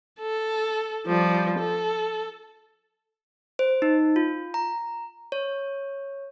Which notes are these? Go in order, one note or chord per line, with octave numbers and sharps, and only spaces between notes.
A4
F3 G3
A4
C5
D#4
F4
A#5
C#5